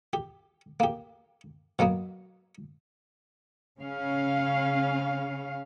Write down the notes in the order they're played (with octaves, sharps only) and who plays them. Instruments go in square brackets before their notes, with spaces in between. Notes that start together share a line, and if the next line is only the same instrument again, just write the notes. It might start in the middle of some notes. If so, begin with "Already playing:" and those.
[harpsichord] G4
A#3 G4
B2 F#3 A#3 B3
[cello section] C#3 C#4 F5